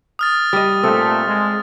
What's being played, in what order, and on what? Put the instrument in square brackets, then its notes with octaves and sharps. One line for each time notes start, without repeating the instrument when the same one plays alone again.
[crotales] D#6 F6 A6
[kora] G3 D#5
[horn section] A#2 A3 [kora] C4 A4
[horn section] G#3